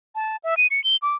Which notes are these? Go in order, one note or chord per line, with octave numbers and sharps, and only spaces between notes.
A5
E5
D#7
C#7
G7
D6